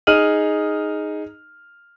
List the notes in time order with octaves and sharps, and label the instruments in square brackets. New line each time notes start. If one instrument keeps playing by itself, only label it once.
[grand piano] D#4 G#4 F6 D#7 F#7